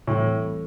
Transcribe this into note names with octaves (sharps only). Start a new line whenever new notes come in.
A2 E3 G3 C4 E4 A4